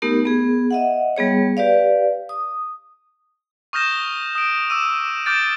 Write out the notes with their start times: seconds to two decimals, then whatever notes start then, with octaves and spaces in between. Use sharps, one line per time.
0.02 A3 B3 D#4 G4 A#4
0.25 B3 G#4
0.71 D#5 E5 F#5
1.17 G3 B3 G#4 C#5
1.57 G4 B4 D5 F5
2.29 D#6
3.73 C#6 D#6 F6 G6 A#6 E7
4.35 D#6 D7
4.70 D6 E6 D#7
5.26 D6 F6 G6 A6 D7